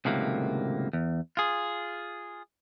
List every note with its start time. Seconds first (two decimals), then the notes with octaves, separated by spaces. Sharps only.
0.05 C#2 A2 C3 D#3 F#3 A#3
0.93 E2
1.37 F4 G#4